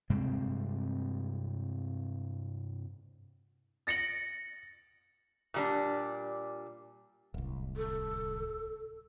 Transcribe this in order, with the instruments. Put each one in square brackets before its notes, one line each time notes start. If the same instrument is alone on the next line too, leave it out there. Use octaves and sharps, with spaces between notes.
[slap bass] G2 C3 G#3 C4
[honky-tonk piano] A6 A#6 C#7 D7 F#7
[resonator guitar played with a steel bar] A#2 G3 D4
[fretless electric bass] D1 C2
[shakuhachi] A4